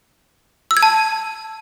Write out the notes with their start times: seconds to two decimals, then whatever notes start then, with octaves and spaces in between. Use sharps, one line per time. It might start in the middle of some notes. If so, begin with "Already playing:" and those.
0.71 E6
0.77 G#6
0.83 A5